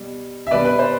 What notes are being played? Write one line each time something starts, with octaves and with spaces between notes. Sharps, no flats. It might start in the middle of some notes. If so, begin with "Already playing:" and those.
Already playing: B2 G3
E5
B2 G3 B4 D5
B4
C5